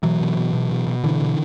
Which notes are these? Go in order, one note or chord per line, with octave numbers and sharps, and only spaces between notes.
B2 E3 F#3
B2
B2
B2
B2
B2
B2 D3 E3
B2